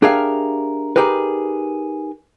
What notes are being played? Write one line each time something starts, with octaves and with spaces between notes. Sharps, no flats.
D4 G4 G#4 A#4 E5 F5
D#4 G4 G#4 A#4 B4